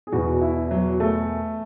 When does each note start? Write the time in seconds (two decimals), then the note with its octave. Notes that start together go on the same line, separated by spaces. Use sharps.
0.07 G#4
0.12 E2 B2 F#4
0.41 E4
0.71 F#3
1.00 A3